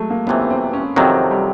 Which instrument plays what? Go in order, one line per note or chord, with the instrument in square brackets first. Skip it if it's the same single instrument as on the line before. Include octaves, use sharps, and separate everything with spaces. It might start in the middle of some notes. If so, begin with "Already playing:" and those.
Already playing: [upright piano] F#3 G#3 A3
A#3
[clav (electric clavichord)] C#2 C3 E3 A3 [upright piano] B3
[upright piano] C4
C#4
[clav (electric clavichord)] F2 C3 D#3 F#3 [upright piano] C4
[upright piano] G3